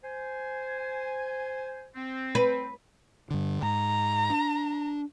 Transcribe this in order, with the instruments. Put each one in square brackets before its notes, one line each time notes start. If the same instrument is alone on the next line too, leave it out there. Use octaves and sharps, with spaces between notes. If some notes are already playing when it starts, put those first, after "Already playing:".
[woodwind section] C5 G#5
C4
[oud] B4
[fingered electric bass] G2 D3
[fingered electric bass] G#2 [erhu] A#5
[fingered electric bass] D4